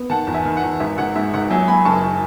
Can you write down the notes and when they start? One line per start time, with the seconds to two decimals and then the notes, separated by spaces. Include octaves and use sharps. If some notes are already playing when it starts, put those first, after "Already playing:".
Already playing: B3
0.10 D#3 F#5 A5
0.27 E2
0.33 E5 G#5
0.45 D#3
0.57 F#5
0.63 E2
0.80 G#1 E5
0.98 G#1 F#5
1.15 G#2 E5
1.34 G#1 F#5
1.50 F#3 E5 G#5
1.68 F#3 G#5 B5
1.85 F#1 A5 C#6